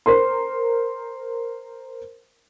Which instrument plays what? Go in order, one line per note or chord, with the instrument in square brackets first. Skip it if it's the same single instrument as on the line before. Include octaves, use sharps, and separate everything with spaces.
[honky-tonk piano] A#4 C5 C6